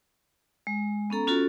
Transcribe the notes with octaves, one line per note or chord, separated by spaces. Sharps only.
G#3
B3 C#4 A4 A#5
C#4 F4 F#4 A4